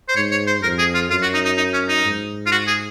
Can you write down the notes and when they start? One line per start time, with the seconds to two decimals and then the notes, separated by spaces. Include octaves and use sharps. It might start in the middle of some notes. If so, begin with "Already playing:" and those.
0.09 C5
0.16 G#2 C#5
0.31 C#5
0.47 C5
0.63 F2 A#4
0.79 G#4
0.94 F4
1.10 F#2 F4
1.22 F#4
1.34 D#4
1.45 D#4
1.57 D#4
1.73 C#4
1.89 D#4
2.05 G#2
2.46 F4
2.52 F#4
2.67 G#4